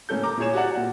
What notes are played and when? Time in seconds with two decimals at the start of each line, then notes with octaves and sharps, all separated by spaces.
0.09 A2 A#3 C#4 A4 G6
0.23 A#5 D6
0.37 A#2 E4 G#4 C#5 E7
0.53 F#4 G4 D5 F#5
0.77 A#2